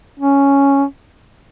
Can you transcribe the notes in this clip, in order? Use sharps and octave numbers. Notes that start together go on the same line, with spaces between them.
C#4